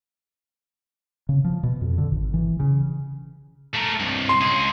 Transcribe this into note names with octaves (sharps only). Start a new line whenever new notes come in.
C#3
F3
B2
F2
D3
G#1
E3
C#3
A3 A#4
C2 G2
C6
C#2 G#4